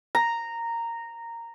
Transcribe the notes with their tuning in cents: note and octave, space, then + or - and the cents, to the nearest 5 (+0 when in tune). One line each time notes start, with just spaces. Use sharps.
A#5 -10